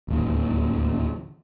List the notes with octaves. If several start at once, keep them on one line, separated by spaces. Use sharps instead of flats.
D1 G#1 D#2